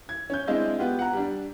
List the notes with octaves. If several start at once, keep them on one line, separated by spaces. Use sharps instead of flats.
G#6
C#4 G6
G#3 C4 D4 E4 D#5 F5
B3 F4 G4
F#5 A#5
G3 D4